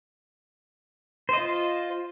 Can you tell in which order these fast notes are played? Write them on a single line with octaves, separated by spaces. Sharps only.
C5 D#5 F4